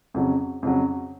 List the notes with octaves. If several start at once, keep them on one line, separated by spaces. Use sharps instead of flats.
F2 C#3 F#3
F2 C#3 F#3